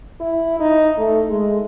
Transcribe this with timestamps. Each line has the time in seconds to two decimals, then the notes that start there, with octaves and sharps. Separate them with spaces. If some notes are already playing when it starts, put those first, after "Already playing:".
0.20 E4
0.60 D#4
0.98 A3
1.30 G#3